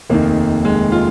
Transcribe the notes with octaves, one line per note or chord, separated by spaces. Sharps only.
F1 D#2 D#3 A#3
G#3
F4